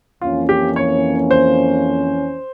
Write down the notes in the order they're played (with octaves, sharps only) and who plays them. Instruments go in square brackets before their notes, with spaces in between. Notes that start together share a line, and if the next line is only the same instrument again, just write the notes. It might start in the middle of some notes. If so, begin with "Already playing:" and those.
[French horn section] F2 E3 A#3 C#4 [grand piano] F4
[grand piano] G4
C#5
C5